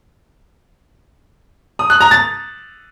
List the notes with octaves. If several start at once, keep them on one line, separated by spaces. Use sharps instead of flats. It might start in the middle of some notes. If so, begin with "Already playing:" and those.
D#6
F#6
A#5
A6